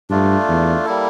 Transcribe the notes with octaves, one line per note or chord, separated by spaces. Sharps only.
G2 A3 D4 F4
E2
G3 A#3 E4 A4